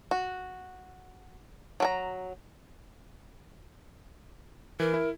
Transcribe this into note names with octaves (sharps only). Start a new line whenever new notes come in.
F#4
F#3 A#4 A#5
E3 A#4
E4